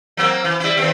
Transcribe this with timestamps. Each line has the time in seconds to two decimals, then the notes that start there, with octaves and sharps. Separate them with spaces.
0.17 F#3 A#3 C4
0.44 E3
0.60 G3 E4
0.77 D#2 C4